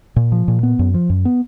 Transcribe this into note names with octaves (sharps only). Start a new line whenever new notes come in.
A#2
F3
A#2
B3
F#2
F3
F#2
B3